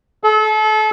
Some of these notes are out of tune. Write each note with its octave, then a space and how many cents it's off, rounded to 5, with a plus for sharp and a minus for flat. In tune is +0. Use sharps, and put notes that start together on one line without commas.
A4 -35